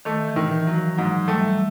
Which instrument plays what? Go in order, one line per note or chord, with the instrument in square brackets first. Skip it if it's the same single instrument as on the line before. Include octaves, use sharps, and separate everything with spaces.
[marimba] D#3 [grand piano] A3
[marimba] E3
[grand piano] D#3
[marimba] E3
[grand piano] F#3
[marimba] F3
[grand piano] G#2 [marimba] F#3
[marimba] G3 [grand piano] A3